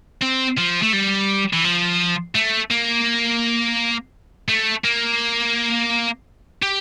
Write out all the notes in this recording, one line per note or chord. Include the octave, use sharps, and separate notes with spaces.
C4
F3
A3
G3
E3
F3
A3
A#3
A3
A#3
G4